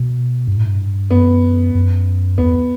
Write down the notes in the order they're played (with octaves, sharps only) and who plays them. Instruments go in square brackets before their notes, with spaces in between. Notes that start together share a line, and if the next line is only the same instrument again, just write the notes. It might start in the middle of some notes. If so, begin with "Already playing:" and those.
Already playing: [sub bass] B2
G2
A2
G2
[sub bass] F#2 [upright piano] B3
[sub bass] F#2
[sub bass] E2 [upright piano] B3